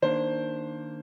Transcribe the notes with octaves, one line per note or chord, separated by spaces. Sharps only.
D#3 A#3 D4 C5